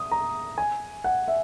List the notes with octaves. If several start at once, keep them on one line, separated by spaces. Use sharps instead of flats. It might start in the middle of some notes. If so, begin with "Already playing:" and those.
Already playing: D#6
A#5
G#5
F#5
E5